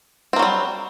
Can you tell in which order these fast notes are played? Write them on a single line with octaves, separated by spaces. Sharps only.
C4 A#3 F#3 G3